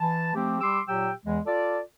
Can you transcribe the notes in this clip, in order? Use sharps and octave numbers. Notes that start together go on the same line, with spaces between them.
E3 A5
F3 A3 C4 G4
G3 G4 C6 D6 E6
A#2 F#3 G4 G5 E6
E2 E3 G#3
F4 A4 D5